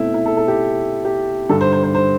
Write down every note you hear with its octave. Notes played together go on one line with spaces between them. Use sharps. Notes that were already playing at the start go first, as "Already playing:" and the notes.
Already playing: B2 A3 C4 E4
E4
A4
A4
G4
G4
G2 D3 G3 A4
C5
C5
C5
C5